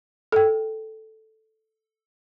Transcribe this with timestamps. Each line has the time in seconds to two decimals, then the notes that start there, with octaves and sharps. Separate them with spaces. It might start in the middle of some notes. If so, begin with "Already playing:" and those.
0.32 A4 G5